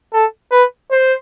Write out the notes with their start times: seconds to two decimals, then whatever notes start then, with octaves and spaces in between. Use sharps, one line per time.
0.13 A4
0.52 B4
0.91 C5